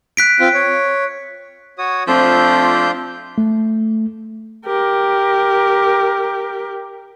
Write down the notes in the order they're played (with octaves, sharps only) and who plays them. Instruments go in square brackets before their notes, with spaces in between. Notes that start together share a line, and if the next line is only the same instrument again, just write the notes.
[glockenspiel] F#6 B6 D7
[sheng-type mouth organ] C4 F4
C#5
F#4 C#5 D#6
[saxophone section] F3 A3 C4 [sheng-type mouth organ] D4 F4 G6
[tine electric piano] A3
[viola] G4 A#4